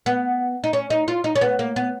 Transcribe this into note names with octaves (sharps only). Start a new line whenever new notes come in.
B3
D#4
C#4
D#4
F4
D#4
C#4
B3
A#3
B3